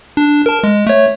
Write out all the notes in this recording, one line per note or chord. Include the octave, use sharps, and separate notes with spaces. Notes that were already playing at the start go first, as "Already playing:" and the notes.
D4
A#4 A5
G#3
A3 C#5